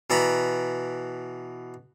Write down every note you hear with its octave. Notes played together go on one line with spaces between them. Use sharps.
B2 E3 D5 A#5 B5